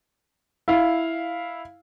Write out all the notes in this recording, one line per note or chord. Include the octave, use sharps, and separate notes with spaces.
E4 F5